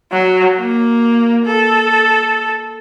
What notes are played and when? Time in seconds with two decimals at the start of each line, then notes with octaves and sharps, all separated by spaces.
0.12 F#3
0.57 A#3
1.45 A4